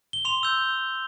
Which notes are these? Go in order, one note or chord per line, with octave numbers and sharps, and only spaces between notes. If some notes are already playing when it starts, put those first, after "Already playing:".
G7
C6 F7
E6 G6